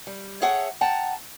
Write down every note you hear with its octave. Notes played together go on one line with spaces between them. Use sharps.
G3
G#4 A4 C#5 E5 F#5 G5
F#5 G5 A5 A#5